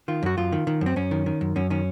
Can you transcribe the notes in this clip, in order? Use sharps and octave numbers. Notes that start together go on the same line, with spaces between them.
D#3 F4
F#2 F#4
F#2 F4
D#3
D#3
F#2 C4
F#2 C#4
D#3
D#3
F#2
F#2 C#4
D#3 C#4